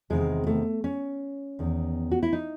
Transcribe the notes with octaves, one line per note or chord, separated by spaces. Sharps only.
E2 C3 D#3 G#3
A3
C#4
E2 D#3
F#4
E4
D#4